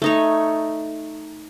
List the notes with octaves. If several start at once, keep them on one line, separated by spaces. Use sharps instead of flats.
A3 D#4 C#5